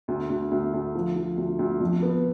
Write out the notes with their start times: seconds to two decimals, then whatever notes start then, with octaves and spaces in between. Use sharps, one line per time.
0.08 D2
0.30 D2
0.51 D2
0.73 D2
0.95 F3
1.16 F3
1.37 D2
1.59 D2
1.80 F2
2.02 B3